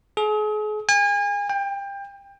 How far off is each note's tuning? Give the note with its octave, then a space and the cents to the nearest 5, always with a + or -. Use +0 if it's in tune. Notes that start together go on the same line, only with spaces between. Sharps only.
G#4 +40
G#5 -35
G5 +25